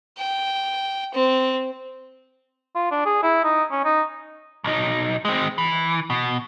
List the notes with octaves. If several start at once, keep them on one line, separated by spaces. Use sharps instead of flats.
G5
C4
F4
D4
G#4
E4
D#4
C#4
D#4
B1 D#4
G#3 C4
E3
B2